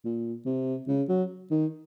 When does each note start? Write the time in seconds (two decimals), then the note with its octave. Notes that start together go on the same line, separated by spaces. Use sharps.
0.05 A#2
0.46 C3
0.88 C#3
1.09 F#3
1.51 D#3